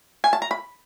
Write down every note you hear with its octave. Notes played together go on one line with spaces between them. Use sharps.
G#5
A5
A#5
B5